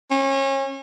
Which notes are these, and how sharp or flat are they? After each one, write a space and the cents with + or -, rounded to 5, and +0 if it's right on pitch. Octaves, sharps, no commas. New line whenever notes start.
C#4 -30